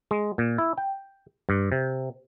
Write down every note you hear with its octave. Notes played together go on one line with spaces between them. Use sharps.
G#3
A#2
E4
G5
G2
C3